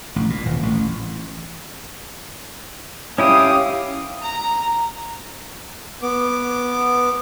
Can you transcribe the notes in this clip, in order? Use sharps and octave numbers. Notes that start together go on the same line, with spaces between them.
A1
A#2
D#1
A1
C#4 E4 G4 F5 D#6
A#5
B3 D6